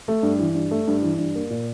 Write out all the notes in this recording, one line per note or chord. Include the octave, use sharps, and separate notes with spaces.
A3
G2
E3
G2
A3
G2
E3
G2
A#3
A#2